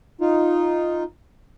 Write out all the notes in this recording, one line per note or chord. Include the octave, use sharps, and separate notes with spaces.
D#4 F4